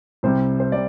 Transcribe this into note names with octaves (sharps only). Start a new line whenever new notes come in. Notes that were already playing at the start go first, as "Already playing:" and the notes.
C2 C3 G3 C4 C5
C5
C3 D5